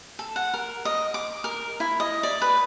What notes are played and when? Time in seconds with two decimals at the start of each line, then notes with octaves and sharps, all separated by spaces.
0.19 A4
0.36 F#5
0.54 A#4
0.85 D#5
1.14 D6
1.44 A#4
1.80 E4
2.00 D#5
2.23 D5
2.42 B4